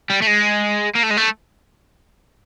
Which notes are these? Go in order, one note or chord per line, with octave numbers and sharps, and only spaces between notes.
G3
A3
G#3
A#3
A3
G#3
A3